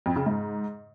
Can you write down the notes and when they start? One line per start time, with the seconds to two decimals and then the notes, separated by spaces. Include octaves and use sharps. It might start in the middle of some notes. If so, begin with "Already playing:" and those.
0.06 F2
0.16 C#3
0.26 G#2